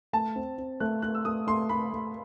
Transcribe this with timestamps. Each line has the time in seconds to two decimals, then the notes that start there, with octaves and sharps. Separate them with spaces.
0.13 A3 A5
0.35 C4
0.58 C4
0.80 A3 F#6
1.02 A3 F#6
1.15 E6
1.25 A3 D#6
1.47 A3 C6
1.69 A3 B5
1.93 A3